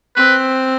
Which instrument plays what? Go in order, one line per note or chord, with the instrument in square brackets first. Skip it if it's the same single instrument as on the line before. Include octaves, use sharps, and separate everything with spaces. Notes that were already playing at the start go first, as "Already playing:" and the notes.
[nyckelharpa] C4 [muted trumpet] B4